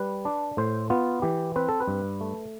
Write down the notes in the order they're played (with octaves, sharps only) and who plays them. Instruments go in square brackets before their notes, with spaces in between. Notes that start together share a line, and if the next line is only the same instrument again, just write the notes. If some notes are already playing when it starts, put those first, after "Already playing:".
Already playing: [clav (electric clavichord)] G3 B4
D4
A2 C5
B3 F4
E3 G4
C4 B4
A4
B4
G2
A3